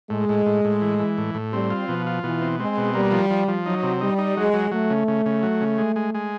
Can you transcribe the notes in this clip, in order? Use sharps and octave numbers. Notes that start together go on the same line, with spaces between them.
A2 G#3
A2
A2
A2
E3
E3
A2
A2
G3 C4
F4
B2 F3
F4
B2 E3
C4
G#3 C4
B2
G3 A#3
F3
F3
F3
F#3 D#4
C3
G3 D#4
D#4
F#3 G#3
F#3
F#3 A3
C#3
C#3
C#3
F#3
C#3
G#3
G#3
G#3